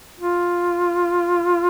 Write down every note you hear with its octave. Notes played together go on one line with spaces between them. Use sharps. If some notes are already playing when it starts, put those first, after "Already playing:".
F4